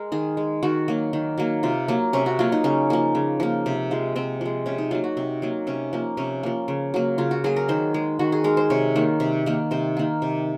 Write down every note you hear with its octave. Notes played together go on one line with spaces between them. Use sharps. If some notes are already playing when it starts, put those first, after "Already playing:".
Already playing: G#3 A#4
D#3 G#4
G#3
D#3 F#4
F#3 A#3
D#3
F#3 A#3
C3 F4
F#3 A#3
C3 C#4
F#4
F#3 A#3 F4
D#4
C#3 C#4
F3 A#3
C#3
F3 A#3
C3
F3 G#3
C3 C4
F3 G#3
C3 C#4
D#4
F#3 A#3 F4
F#4
C3 C4
F#3 A#3
C3 C#4
F3 A#3
C3 C#4
F3 A#3
C#3
F#3 A#3
C#3 F4
F#4
F#3 A#3 G#4
A#4
D#3 C5
G#3
D#3 F#4
G#4
G#3 A#4
C5
C3 C#5
D#3 A#3
C3
D#3 A#3
C3 C5
D#3 A#3
C3